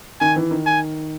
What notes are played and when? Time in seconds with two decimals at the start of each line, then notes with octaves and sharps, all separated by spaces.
0.21 D#3 G#5
0.36 E3
0.51 D#3
0.66 G#5